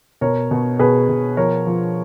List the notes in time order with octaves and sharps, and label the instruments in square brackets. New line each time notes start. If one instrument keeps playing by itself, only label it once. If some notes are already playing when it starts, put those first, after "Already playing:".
[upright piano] B2 A#4 C#5
B2
B2 G#4 B4
B2
F3 A#4 C#5
F3